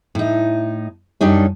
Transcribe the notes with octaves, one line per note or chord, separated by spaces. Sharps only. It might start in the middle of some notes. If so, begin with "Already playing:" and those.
A2 D#4
F#2 G3 D4 D#4 C#5